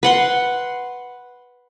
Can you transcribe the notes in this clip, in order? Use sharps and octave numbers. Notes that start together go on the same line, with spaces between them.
B4 F#5 C6